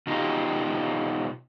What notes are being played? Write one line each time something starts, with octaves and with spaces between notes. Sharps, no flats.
B2 D#4 F4 G4